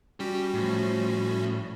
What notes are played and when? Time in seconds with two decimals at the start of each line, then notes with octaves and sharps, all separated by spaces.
0.20 G3 C#4 F#4 G4
0.54 A2 F3